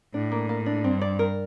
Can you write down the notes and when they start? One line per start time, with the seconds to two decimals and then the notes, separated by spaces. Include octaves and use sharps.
0.14 A2 D4
0.32 A#3
0.49 A#3
0.66 D4
0.84 G2 C4
1.02 D5
1.19 A#4